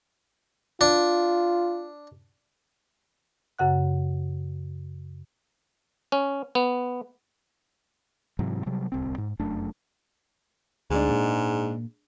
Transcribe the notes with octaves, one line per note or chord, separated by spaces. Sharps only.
D4 F4
F#2 C#3 F#5 F#6
C#4
B3
G#2 C3 E3 F#3
C3 F#3 G3
D1 C2 C4
G#2
F1 F#2 A3 D4
D2 G#2 G#3 D4
A#2